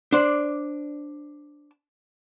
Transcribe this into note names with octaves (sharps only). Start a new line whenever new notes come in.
D4 C5 D5